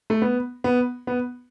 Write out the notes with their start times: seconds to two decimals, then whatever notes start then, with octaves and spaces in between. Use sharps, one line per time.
0.10 A3
0.22 B3
0.64 B3
1.07 B3